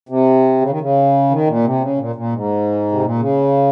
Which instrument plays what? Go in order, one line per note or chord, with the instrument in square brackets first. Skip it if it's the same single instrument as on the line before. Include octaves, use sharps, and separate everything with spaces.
[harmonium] C3
C#3
D#3
C#3
D#3
A#2
C3
C#3
A#2
A#2
G#2
C3
A#2
C#3